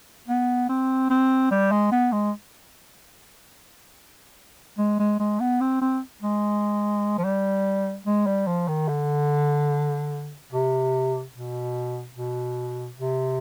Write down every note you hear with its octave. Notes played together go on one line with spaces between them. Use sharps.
B3
C4
C4
G3
G#3
B3
G#3
G#3
G#3
G#3
B3
C4
C4
G#3
F3
G3
G#3
G3
F3
D#3
D3
C3
B2
B2
C3